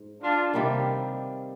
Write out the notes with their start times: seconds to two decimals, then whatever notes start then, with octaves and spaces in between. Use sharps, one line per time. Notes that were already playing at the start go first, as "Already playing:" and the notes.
Already playing: G#2
0.21 D4 F4
0.54 C3 D#3 G3 A#3